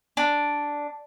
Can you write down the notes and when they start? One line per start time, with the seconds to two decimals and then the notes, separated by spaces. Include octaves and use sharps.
0.17 D4